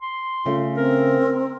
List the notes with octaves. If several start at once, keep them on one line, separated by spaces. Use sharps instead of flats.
C6
C#3 A3 C#4 F4
C4 A#4